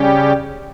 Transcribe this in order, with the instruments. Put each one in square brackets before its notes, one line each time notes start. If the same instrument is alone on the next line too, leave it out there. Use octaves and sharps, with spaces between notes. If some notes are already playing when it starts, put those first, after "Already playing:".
Already playing: [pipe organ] C#3 G3 C#4 G4